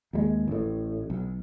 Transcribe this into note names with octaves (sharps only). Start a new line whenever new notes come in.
D#2 G3 G#3
A1 A2
B1